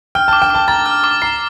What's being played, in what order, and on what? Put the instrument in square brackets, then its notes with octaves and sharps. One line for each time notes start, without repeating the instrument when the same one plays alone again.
[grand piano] G5 [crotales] F6
[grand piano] A5
[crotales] D6
[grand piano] G5
[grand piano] A5 [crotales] D6
[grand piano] A#5 [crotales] A6
[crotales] F6
D6
[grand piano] A#5 [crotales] C7